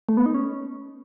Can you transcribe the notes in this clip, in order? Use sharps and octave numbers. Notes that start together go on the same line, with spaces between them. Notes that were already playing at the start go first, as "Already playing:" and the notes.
A3
B3
D#4
C#4